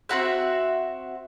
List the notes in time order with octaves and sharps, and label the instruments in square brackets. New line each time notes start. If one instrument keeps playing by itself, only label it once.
[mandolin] C4 E4 F#4 E5